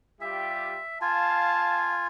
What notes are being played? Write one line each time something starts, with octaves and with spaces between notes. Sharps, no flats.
G3 F4 G4 E5
F4 F5 G#5 A5